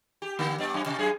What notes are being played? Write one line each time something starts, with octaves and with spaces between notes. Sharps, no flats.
G4
D3 A#3 B3
G2 B3 D5
F#2
C3
F#2 G#4